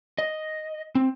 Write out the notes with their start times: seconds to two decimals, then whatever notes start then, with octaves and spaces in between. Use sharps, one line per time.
0.18 D#5
0.95 C4